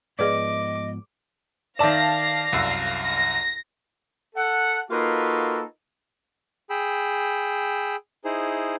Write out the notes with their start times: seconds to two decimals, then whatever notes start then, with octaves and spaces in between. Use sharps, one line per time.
0.19 G#2 F3 B3 G#4 B4 D5 D#5 D6
1.79 D#3 D5 E5 F5 A5 A#6 C7 E7
2.52 C2 F#2 E6
3.02 A#6
4.35 A4 F#5
4.90 A#3 D#4 F4 F#4 A4 B4
6.70 G#4 G5 B5 E6
8.25 D#4 E4 G#4 C5